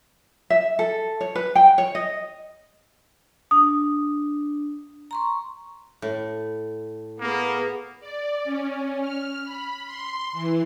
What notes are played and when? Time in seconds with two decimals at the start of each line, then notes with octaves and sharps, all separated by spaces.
0.50 E5
0.79 A4
1.21 C#5
1.35 B4
1.55 G5
1.78 C#5
1.95 D#5
3.51 D4 D#6
5.11 A#5 C6 C#6
6.02 A2
7.20 A#3 B3 G#4
8.00 D5
8.44 C#4
9.00 F6
9.44 B5
9.86 C6
10.33 E3